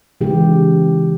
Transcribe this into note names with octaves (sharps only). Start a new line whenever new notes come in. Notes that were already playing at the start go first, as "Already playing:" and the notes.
C#3 E3 G#3 G4